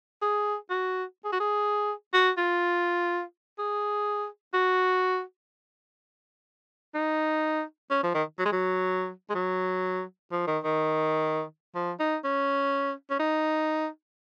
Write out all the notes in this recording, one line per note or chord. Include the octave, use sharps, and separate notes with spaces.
G#4
F#4
G#4
F#4
G#4
F#4
F4
G#4
F#4
D#4
C#4
F3
D#3
F#3
G#3
F#3
G#3
F#3
F3
D#3
D#3
F3
D#4
C#4
C#4
D#4